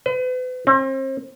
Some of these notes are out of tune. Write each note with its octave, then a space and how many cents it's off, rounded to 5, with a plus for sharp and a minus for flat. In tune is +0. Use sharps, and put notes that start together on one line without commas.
B4 +40
C4 +40